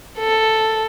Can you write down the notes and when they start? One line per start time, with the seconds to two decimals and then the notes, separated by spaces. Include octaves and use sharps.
0.19 A4